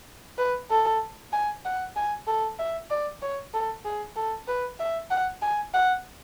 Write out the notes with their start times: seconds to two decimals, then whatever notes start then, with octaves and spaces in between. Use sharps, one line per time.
0.38 B4
0.70 A4
1.33 G#5
1.65 F#5
1.96 G#5
2.27 A4
2.59 E5
2.90 D5
3.22 C#5
3.54 A4
3.85 G#4
4.16 A4
4.48 B4
4.79 E5
5.11 F#5
5.42 G#5
5.74 F#5